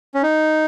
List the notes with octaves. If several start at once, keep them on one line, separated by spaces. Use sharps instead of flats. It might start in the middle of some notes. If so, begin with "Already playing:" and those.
C#4
D#4